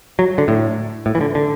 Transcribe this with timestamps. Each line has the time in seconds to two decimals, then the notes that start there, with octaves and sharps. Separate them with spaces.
0.19 F#3
0.38 D3
0.48 A2
1.06 A2
1.15 E3
1.21 D3
1.35 D3